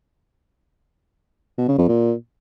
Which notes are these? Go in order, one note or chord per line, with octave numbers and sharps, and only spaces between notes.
B2
C#3
F2
A#2